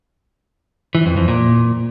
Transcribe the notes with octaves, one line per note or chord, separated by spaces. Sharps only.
E3
F2
F2
A#2